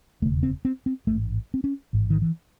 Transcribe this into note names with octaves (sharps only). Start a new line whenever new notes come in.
E1 D#2 C#3 A3
C4
C4
C4
A1 G#2 A3
C4
C#4
A1 G#2
D#3
E3